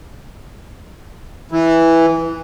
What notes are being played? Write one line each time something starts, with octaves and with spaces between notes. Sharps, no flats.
E3